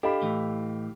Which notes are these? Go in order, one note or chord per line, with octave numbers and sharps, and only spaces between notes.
D4 G4 A4 D#5 F5 B5
A2 E3